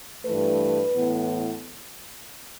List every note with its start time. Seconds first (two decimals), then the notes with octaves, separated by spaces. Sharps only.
0.25 G2 E3 A3 B4
0.95 A2 E3 B3